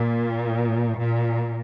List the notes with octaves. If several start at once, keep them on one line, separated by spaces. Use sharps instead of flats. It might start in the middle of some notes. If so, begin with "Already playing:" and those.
Already playing: A#2
A#2